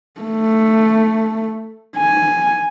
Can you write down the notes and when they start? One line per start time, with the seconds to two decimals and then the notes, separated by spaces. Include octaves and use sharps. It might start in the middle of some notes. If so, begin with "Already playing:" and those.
0.20 A3
1.97 G#5